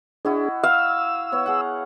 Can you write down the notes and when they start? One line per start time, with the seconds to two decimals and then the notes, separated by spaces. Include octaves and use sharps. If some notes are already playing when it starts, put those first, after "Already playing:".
0.25 D4 E4 F#4 G#4 D#5
0.63 F5 E6
1.32 B3 C#5
1.46 G#4 F#5